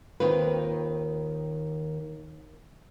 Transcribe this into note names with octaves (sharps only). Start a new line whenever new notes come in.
D#2 D#3 C4 F4 B4